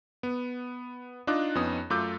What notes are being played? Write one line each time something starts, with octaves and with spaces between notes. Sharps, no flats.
B3
D4 D#4 F4 D#5 D6 F#6
F2 B3 C#4 D#4 D#6
F#2 A3 F4 D6 E6 G6